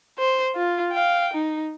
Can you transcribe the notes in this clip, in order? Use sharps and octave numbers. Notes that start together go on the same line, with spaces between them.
C5
F4
F5 G5
D#4